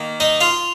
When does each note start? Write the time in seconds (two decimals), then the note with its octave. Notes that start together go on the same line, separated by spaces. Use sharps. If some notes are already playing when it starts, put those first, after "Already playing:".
Already playing: D#3 A#3
0.20 D#4 D#5
0.41 F4 F5